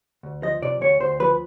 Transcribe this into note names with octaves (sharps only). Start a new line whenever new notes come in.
D2
F3 D#5
C3 D5
D2 C#5
D2 C5
F3 B4